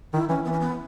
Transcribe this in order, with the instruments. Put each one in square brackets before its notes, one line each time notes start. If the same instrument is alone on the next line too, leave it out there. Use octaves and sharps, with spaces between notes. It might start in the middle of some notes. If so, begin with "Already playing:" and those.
[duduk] D#3 [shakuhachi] E4
[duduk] E3 [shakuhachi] C#4
[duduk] E3 [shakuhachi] B3
[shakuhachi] C#4
B3